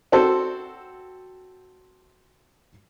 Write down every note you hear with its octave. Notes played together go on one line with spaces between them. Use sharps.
C4 F#4 A4 C5